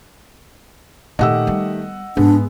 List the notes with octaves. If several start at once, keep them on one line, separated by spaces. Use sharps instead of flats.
A#2 D#3 A3 G4 D#5 F#5 E6
G3 B3
G#2 G#3 B3 D4